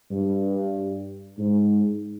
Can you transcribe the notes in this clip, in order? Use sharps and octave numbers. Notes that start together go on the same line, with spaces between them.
G2
G#2